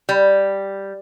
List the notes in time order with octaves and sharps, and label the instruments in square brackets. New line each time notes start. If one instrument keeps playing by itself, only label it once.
[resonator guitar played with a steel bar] G3